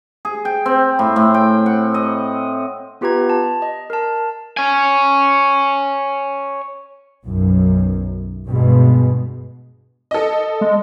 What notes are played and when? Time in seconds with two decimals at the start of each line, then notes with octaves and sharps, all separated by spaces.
0.25 G#4
0.45 G5
0.66 C4
0.99 A2
1.16 A2
1.34 G5
1.66 F#5
1.94 D#5
3.01 B3 F4 G4 B4 A#5 G#6
3.29 A5
3.62 D#5
3.90 A#4 A5
4.57 C#5 G#5
7.24 B1 F#2
8.47 G2 B2 G#3
10.11 A4 D#5
10.61 G#3